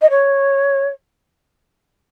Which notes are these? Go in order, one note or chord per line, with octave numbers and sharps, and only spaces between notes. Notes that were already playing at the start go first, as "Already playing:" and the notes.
D#5
C#5